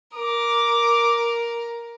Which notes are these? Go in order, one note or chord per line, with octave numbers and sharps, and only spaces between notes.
A#4 D6